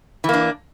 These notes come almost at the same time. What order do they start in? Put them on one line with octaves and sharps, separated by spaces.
E3 A#3 D4